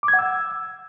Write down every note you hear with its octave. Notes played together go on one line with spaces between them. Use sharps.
D6
G#6
F#5
E6